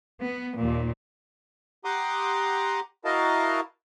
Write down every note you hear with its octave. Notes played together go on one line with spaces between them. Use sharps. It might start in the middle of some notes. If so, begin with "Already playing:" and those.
B3
D#2 A#2
G4 F#5 A#5 C6 D6 D#6
E4 F#4 A#4 D#5 F5 A5